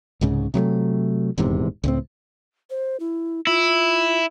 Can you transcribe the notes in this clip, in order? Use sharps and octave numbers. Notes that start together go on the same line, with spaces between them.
C2 G#2 C#3
C3 F#3 G#3 A3
D#1 E2 G#2 C3
C#2 A2 C4
C5
E4
E4 F4